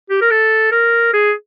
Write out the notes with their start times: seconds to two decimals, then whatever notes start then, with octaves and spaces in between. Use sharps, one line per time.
0.10 G4
0.22 A#4
0.31 A4
0.72 A#4
1.13 G#4